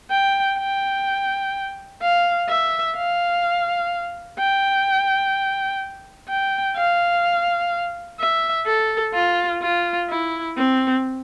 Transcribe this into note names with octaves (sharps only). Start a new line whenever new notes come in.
G5
G5
F5
E5
F5
G5
G5
F5
E5
A4
F4
F4
E4
C4